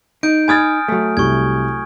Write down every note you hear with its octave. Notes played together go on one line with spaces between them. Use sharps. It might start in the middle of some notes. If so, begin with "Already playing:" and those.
D#4 G6 D7
G#5 B5 D#6 F6 G#6 A6
F#3 A3
C2 G4 C#6 G#6